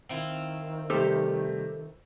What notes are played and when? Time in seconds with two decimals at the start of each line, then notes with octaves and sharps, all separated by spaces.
0.09 D#3 C4 E4 F4
0.90 C3 G3 A3 G4 A4 C5